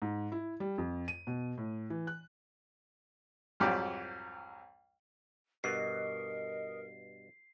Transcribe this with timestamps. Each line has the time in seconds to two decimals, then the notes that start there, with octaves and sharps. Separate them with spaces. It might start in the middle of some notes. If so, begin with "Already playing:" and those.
0.02 G#2
0.32 E4
0.60 G3
0.78 F2
1.08 D#7
1.27 B2
1.57 A2
1.90 E3
2.07 F#6
3.60 C2 F2 G#2 F#3 G4 D5
5.64 G2 B2 F#4 A#4 D#5 C7